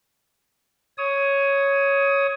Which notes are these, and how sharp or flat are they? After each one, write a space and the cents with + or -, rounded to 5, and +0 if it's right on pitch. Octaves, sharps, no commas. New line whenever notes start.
C#5 +0 D#6 +20